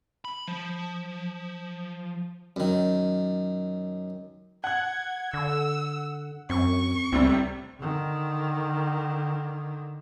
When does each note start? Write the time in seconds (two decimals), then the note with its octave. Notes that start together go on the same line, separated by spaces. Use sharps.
0.25 B5
0.47 F3
2.56 F#2 D#3
4.64 F#5 F#6 G#6
5.34 D3 E6
6.50 F#2 C4 C#6
7.12 C#2 A2 C3 G3 C4
7.78 D3 D#3